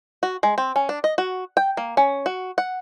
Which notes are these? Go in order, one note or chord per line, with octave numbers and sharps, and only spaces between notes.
F#4
G#3
C4
C#4
D4
D#5
F#4
G5
A#3
C#4
F#4
F#5